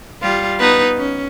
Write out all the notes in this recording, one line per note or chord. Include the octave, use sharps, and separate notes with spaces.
G3 F4
B3 D#4 B4
C#4